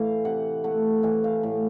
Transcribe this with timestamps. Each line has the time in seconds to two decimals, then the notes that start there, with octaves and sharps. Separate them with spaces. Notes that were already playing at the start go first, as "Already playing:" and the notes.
Already playing: A2 E3 F5
0.25 C3 F#5
0.64 A3 F#5
1.03 E3 F#5
1.24 F5
1.43 A2